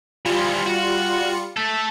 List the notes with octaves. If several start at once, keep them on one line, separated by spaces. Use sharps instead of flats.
E3 F3 G3 F4 C#7
F#4
A3 A4